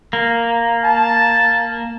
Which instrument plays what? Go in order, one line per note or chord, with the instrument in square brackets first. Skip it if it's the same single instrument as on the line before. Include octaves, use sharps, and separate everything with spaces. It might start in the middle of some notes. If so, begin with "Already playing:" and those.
[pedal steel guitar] A#3
[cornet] A5